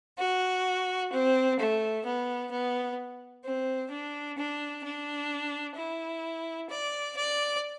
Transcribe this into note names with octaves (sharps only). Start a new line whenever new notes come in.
F#4
C4
A3
B3
B3
C4
D4
D4
D4
E4
D5
D5